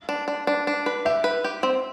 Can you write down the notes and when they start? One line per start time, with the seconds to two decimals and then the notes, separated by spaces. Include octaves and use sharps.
0.09 D4
0.28 D4
0.47 D4
0.67 D4
0.86 B4
1.05 G4 E5
1.24 B4
1.44 G4
1.63 C4